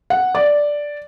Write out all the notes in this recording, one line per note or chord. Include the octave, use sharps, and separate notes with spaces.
F#5
D5